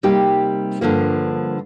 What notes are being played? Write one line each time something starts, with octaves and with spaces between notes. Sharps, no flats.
C3 G3 A#3 D#4 G4
G2 D3 F3 A#3